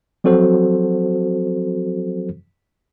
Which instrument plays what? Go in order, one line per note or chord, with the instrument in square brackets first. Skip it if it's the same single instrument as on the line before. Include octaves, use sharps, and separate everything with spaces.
[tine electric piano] F3 F#3 C4 F#4 A4 C5